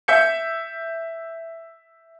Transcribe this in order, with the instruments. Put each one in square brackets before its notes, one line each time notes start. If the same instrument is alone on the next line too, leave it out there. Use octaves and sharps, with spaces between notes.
[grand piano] E5 G6 C#7